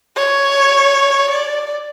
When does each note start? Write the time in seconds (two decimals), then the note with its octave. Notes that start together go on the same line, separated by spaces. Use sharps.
0.16 C#5
1.31 D5